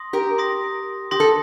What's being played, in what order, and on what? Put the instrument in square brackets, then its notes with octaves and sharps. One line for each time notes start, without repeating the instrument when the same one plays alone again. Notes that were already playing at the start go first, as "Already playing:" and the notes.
Already playing: [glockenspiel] C6 D#6 A#6
[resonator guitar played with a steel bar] G4 A#4
[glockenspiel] C6 D#6 A#6
[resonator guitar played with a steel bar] G4 [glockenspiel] C6 D#6 A#6
[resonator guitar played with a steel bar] A4